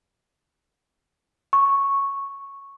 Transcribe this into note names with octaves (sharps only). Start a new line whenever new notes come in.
C#6